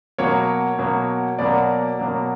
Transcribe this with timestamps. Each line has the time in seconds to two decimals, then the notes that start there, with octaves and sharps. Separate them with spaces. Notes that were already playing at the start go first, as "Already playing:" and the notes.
0.18 B2 F#3 A#3 C#5
0.79 B2 F#3 A#3
1.39 B2 F#3 A#3 D5
1.99 B2 F#3 A#3